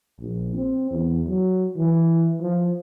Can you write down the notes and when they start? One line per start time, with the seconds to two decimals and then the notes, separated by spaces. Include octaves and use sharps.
0.20 A#1
0.55 C4
0.90 E2
1.28 F#3
1.77 E3
2.40 F3